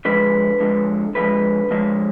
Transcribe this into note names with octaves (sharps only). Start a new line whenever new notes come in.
D3 F3 G#3 B4
D3 F3 G#3
D3 F3 G#3 B4
D3 F3 G#3